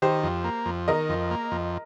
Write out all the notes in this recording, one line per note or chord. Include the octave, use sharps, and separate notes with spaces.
D#3 G4 C5
F2
A#3
F2
D#3 A#4 D#5
F2
A#3
F2